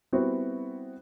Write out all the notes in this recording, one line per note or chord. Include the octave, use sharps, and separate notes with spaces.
G3 B3 C4 E4 F#4 C5